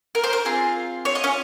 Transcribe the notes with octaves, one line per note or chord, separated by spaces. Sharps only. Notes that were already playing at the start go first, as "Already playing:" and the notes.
A#4
C5
A#4
C4 F4 G#4
C#5
D#5
C#4 C#5